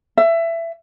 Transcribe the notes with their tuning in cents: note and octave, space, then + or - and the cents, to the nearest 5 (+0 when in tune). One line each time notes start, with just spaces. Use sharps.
E5 +20